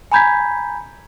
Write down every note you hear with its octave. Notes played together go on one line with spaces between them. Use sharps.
G#5 A#5 B5 G6 G#6 B6